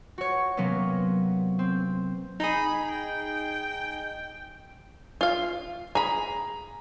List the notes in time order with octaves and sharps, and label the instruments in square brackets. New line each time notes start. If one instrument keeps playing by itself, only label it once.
[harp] F#4 C#5
C3 F#3 A#3 B3 C#4
C4
[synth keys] D#4 G#4 [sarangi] B5
[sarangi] G5
[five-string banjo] F4 F5
[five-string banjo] G#4 B5 [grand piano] A#5